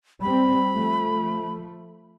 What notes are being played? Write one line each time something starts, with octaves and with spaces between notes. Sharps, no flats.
G3 C4 B5
F3 A3